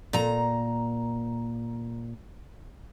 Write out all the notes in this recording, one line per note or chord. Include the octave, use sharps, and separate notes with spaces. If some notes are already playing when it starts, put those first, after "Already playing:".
A#2 A#5